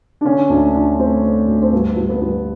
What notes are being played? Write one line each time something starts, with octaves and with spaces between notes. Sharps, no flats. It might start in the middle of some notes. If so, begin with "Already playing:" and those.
D4
D3 C#4
D2 D4
D3 D4
A3 C4
A3
D2
C4
G2 B3
G2
B3
G2